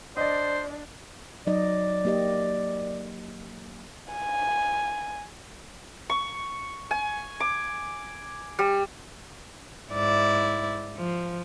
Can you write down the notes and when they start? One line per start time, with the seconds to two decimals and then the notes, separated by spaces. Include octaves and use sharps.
0.17 D4 C5 D5 D#5
1.47 F#3 D#4 D5 D#5
2.05 A#3 G4 D#5
4.13 G#5
6.10 C#6
6.91 G#5
7.40 D6
8.59 G3
9.92 G#2 E4 D5
10.98 F3